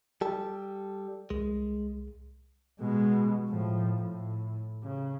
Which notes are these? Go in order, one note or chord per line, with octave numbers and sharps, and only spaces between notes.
G3 G4 A4
C2 G#3
B2 G#3
A2 F3
A2
C#3